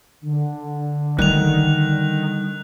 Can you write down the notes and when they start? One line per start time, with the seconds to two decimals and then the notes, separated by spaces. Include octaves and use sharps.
0.23 D3
1.19 D#3 G3 F#6 F7